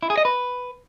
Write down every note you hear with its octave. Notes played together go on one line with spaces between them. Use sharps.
E4
G#4
D#5
B4